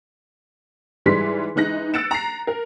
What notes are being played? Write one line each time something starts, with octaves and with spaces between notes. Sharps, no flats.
G#2 E3 G3 G#3 C6 B6
E3 G#3 D#4 F#6 A#6
E6 F#6 A6 C#7 D7 E7
A#5 C7
A#4